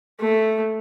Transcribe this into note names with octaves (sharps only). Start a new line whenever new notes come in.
A3